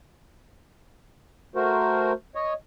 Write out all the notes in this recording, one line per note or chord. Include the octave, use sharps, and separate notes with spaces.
A3 F#4 A#4 C5
C#5 D#5